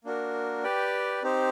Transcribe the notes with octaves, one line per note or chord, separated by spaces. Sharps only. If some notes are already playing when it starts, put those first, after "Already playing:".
A#3 D4 F#4 A#4
G4 B4 D5 G5
C4 D#4 G4 C5